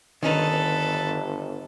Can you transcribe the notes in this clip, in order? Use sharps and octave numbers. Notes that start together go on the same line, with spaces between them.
G1 D#3 C#4 D#4 A4 B4